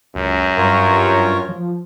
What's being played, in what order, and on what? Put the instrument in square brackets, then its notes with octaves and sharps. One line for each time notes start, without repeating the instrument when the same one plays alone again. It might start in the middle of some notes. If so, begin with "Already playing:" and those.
[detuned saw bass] C#2 [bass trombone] F#2
[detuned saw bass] G2 [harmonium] F4 A#4 C#5
[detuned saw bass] F3